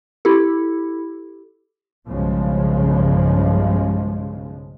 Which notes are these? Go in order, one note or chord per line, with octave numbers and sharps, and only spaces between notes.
E4 G4 A4
B1 G2 C#3 F3 G#3